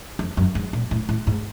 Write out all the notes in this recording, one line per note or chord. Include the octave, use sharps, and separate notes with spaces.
F2
F#2
G#2
A#2
A2
A2
G#2